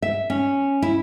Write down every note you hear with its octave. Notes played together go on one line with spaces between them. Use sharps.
E5
C#4
E4